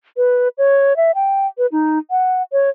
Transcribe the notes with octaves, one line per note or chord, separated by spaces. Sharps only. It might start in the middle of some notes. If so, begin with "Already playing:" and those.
B4
C#5
E5
G5
B4
D#4
F#5
C#5